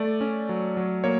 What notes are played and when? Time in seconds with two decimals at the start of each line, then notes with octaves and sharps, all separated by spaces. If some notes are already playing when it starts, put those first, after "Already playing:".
Already playing: A3 D5
0.21 C#4
0.49 F#3
0.77 F#3
1.04 A#3 C#5